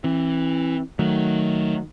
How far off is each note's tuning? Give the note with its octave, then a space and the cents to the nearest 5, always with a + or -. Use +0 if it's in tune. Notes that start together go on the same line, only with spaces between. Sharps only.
E3 +0 C4 +35
D#3 +0 F#3 +0 A3 +0